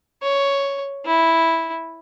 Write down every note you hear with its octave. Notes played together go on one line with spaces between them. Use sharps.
C#5
E4